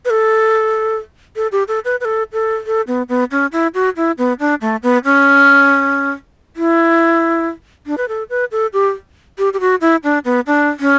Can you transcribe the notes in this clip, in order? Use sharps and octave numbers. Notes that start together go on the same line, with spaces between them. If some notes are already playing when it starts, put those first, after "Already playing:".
B4
A4
A4
G4
A4
B4
B4
A4
A4
A4
B3
B3
C#4
E4
F#4
E4
B3
D4
A3
B3
C#4
E4
D4
B4
A4
B4
A4
G4
G4
G4
F#4
E4
D4
B3
D4
C#4